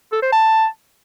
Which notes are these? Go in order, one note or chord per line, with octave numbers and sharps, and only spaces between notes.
A4
C5
A5